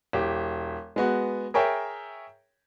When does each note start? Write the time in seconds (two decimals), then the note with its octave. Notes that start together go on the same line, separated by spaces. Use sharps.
0.13 E1 G4
0.96 G#3 B3 F#4
1.54 G#4 A#4 C#5 E5 G5